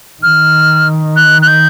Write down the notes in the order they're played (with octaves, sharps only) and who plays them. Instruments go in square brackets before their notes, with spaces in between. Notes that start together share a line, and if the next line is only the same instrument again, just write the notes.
[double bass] D#3 [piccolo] F6
[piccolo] F#6
F#6
G6